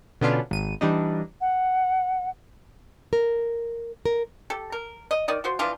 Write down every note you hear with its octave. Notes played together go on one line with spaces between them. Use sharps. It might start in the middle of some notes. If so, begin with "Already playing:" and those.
B2 D3 B3 C#4 D4 F4
G#1 D#7
E3 G3 D4 D#4
F#5
A#4
A#4
G4 A4
A#4
D#5
D#3 D5 D#5
F3 F#4 C5
E3 F3 D4 F4